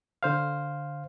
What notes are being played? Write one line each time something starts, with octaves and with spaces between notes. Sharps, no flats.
D3 C5 F5